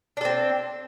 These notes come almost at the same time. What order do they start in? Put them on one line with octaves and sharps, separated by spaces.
D4 A4 C4